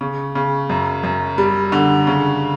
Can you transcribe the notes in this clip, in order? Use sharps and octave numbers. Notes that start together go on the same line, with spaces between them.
C#3
C#3
F#2
F#2
G3
D3
C#3